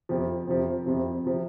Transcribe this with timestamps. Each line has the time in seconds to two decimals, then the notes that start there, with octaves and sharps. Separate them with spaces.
0.09 F2 C3 F3
0.47 F2 C3 F3
0.86 F2 C3 F3
1.26 C3 F3